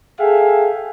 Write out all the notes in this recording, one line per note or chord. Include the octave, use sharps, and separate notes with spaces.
G#4 A4 E5 F5 G5